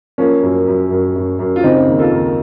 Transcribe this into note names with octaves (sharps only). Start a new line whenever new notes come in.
F3 A#3 C#4
F#2
F#2
F#2
F#2
F#2
F4
C#3 C4 D#4
D#2
F4 A4
D#2